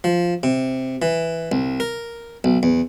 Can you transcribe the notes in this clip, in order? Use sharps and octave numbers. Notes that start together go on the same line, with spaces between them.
F3
C3
E3
C2
A#4
B1
E2